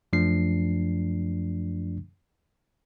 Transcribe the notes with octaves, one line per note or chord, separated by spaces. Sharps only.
F#2 F3 A3 D4 C7